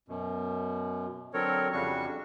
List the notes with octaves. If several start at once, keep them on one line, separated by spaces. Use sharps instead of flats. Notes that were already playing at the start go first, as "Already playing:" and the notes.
F#2 B2
D3 F#3 C4 A4 A#4 C#5
F2 C#3 G3 D4 F#4 C#6